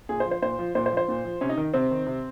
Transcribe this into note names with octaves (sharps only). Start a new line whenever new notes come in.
A#2 G#4
C5
F3
C5
A#2 C5
F3
A#2 C5
C5
F3
C5
A#2
F3
C3 C#4
D#4
D#3
C3 C4
D#3
C3